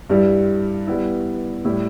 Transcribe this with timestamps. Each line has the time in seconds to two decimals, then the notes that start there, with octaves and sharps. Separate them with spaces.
0.10 G2 G3 E4
0.87 G3 B3 E4
1.65 A2 G3 E4